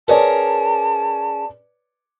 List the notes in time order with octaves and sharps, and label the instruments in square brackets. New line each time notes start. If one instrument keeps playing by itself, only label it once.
[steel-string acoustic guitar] C#4 G#4 A#4 [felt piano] B4 C#5 D5 [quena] A5